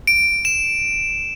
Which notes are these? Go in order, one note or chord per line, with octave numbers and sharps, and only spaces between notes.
D7
E7